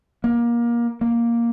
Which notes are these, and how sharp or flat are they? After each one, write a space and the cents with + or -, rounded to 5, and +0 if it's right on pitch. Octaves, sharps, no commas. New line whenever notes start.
A#3 +25
A#3 +5